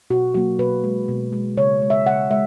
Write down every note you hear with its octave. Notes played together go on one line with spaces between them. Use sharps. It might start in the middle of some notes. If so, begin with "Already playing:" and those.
B2 F#4
F#3 A#3 F#4
B2 B4
G#3
B2
G#3
C#3 C#5
G#3
E5
C#3 F#5
G#3 E5